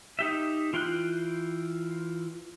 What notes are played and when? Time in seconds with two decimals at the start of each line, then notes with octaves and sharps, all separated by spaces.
0.19 D#4 G4 E5
0.73 E3 F4 G5 C6 F#6